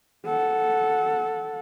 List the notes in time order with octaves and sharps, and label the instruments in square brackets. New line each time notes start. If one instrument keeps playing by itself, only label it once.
[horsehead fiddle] A4 F#5